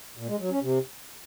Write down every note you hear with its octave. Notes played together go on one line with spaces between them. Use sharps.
A#2
G#3
F#3
C#4
C3